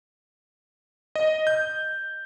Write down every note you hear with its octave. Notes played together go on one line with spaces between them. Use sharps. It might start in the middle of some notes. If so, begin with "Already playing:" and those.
D#5
G6